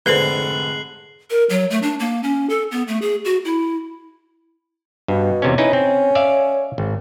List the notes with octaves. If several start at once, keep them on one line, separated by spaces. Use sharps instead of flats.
F1 G#2 D3 B4 C5 F#6 C7 F#7
A#4
F#3
A3
D4
A#3
C#4
A4
B3
A3
G#4
F#4
E4
G2 B2
E2 C3 C#4
C#4 D#4 E4 B4
C4
D5 E5 F5
G#1